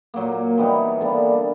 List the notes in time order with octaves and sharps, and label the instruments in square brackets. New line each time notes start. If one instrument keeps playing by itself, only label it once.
[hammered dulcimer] A#2 F#3 A#3
E3 G3 B3 D#4
D3 G3 A#3 D4